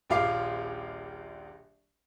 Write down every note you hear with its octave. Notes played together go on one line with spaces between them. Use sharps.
D#1 A#1 F4 F5 D6 C7